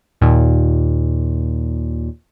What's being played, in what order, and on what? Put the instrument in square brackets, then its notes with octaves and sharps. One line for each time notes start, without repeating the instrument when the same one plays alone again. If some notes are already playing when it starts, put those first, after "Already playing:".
[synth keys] D#2 A#2